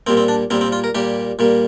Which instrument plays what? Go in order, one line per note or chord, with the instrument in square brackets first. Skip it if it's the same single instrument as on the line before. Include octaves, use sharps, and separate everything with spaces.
[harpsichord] A#2 G3 A#3 C4
C4
D4
A#2 G3 A#3 C4
C4
F4
A#4
A#2 G3 A#3 G4
A#2 G3 A#3